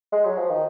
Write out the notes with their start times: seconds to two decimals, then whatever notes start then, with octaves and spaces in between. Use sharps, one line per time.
0.12 G#3
0.25 F#3
0.38 F3
0.49 D#3